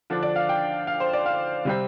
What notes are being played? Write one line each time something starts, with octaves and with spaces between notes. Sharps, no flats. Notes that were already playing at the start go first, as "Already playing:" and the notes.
D3 F3 D4
D5
F5
G5
F5
C5
D5
F5
C3 G3 C4